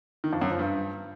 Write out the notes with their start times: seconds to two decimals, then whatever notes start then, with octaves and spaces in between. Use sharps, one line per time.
0.24 D#3
0.33 F2
0.42 F#2
0.50 F3
0.59 G2